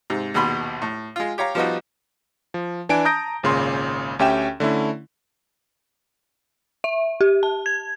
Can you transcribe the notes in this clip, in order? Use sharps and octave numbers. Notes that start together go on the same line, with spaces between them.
G#2 C3
A#1 D#2 B2 B5 C6
A2
G#3 F4
G4 C#5 F5 A#5
F3 G3 B3 D#4 F4 F#4
F3
E3 D4 G#5 D7
A5 A#5 D#6 G6 A#6 D7
G#1 A#2 C#3 C#4 C6
D2 C#4 G4 E5 G5 E7
D3 A3 C#4 E4
E5
G4
A5
G#6